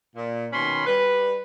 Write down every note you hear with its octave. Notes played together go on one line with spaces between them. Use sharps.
A#2
B2 D#3 C#4 B5 C6
G3 B4